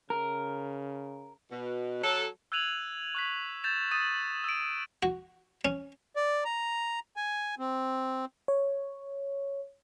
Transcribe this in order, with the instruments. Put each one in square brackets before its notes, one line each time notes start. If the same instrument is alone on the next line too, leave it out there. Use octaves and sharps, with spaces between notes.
[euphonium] C#3 [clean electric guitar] A#4
[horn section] B2
F#3 A4
[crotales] E6 F#6 G#6 D#7 F7 F#7
C#6 F#6 B6
G6 A6 E7 F7
D#6 A6 D#7
E6 D7
[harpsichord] F#4
C#4
[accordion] D5
A#5
G#5
C4
[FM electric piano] C#5